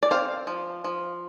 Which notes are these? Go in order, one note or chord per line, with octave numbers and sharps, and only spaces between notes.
D5
C4 C5 F5
F3
F3